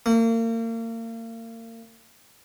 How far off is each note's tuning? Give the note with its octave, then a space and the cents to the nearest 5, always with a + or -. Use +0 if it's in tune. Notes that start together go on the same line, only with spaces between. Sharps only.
A#3 -35